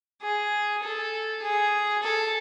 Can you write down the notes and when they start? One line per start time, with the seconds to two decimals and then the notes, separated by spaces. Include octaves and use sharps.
0.22 G#4
0.82 A4
1.43 G#4
2.03 A4